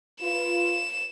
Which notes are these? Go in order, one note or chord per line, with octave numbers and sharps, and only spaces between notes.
F4 B4 E7